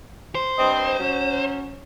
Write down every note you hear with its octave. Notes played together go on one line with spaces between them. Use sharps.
C5
G2 C4 D#5
F#3 C#4